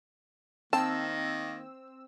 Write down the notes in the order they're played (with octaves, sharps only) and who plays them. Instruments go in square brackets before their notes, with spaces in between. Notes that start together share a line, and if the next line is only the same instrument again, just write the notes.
[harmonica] D#3 A#3 [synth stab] C4 E6 [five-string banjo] A5